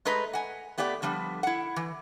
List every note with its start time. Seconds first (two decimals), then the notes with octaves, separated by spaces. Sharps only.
0.05 G#3 A3 G#4 B4 D#5 A#5
0.33 F#5 G#5
0.78 A3 B3 G4 D5 F#5 G5
1.02 D3 F3 G3 B3
1.43 E4 F#5
1.76 E3